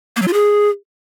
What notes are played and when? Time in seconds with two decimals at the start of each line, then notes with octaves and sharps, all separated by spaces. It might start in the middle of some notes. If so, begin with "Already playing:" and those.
0.16 A#3
0.22 F#3
0.27 F4
0.33 G#4